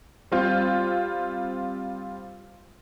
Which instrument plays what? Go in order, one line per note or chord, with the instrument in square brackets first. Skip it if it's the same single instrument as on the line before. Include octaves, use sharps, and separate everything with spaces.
[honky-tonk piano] G3 C4 F4 G6